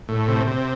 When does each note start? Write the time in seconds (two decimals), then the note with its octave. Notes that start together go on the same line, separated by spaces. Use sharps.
0.09 A2
0.28 C3
0.47 C3